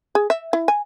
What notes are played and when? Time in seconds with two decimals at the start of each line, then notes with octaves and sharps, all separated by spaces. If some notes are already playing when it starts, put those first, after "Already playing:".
0.15 G#4
0.30 E5
0.53 E4
0.68 G#5